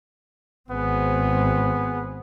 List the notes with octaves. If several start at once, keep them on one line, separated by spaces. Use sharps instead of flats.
G#1 B3 C4 G#4